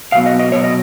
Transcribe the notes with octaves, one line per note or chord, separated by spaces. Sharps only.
B2 F#3 B3 F5
D#5
D#5
B2 F#3 B3 C#5
D#5